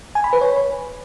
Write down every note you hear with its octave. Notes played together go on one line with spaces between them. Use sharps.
G#5
B5
B4
C#5